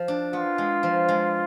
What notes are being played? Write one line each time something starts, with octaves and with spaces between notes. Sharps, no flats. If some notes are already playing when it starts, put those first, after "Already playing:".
Already playing: F3
D4
B3 F4
G#3
F3
G#3